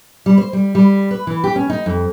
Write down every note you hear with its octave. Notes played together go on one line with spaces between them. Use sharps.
G3
C5
G3
G3
B4
E3
G4
C#4
D#4
F2